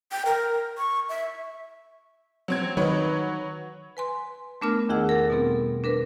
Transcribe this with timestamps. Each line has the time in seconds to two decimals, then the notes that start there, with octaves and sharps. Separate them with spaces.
0.12 G5
0.26 A#4
0.78 C#6
1.09 E5
2.48 F#3 C4 G#6
2.77 D#3 F#3 B4 C#5
3.97 B4 G#5 C6
4.62 A3 B3 D4 A#4 A5 F6
4.89 E2 D#3 F4 G#4 F#5 E6
5.09 A4 A#4
5.30 B2 G3 B3 C4 A4
5.84 D4 A#4 B4